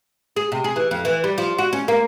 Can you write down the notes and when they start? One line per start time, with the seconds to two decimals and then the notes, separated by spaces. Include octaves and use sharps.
0.36 G#4
0.52 C3
0.64 G#4
0.76 E3
0.91 F2
1.05 E3
1.24 G3
1.38 F3
1.58 F#4
1.73 C#4
1.88 A#3